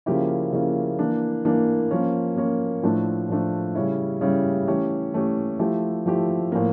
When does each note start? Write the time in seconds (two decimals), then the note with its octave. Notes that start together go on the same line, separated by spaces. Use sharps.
0.06 C#3 F3 A#3 E4 G4
0.52 C#3 F3 A#3 E4 G4
0.99 E3 A#3 D4
1.45 E3 A#3 D4
1.91 F3 A#3 C#4
2.36 F3 A#3 C#4
2.83 A2 F3 A3 D4
3.29 A2 F3 A3 D4
3.75 C#3 G3 C#4 E4
4.21 C#3 G3 C#4 E4
4.67 E3 A3 C#4 G4
5.14 E3 A3 C#4 G4
5.59 F3 A3 E4 G4
6.06 F3 A3 E4 G4
6.52 A2 F3 A#3